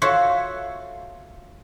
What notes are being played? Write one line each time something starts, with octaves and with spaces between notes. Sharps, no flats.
F4 F#4 A4 C5 C#5 E5